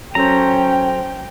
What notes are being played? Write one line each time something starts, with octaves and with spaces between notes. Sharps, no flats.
F#3 C#4 A4 C5 G5 A#5